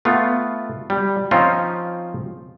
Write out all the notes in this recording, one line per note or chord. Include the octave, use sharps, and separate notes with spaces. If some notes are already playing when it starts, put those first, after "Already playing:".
A3 B3 F4
G3
F3 C4 C#4 D#4 F4